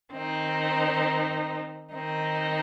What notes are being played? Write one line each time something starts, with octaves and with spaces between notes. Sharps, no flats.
D#3 C4 D#4
D#3 C4 D#4